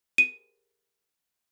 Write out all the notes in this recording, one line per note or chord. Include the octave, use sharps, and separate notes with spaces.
D#7